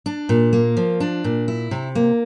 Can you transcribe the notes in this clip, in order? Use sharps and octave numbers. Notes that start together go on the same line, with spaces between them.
D4
A#2
A#3
F3
D4
A#2
E4
C3
A#3